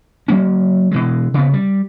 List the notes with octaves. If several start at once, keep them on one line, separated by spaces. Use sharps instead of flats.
F#3 A#3 C#4
B2 E3 G#3
C#3 B3
G3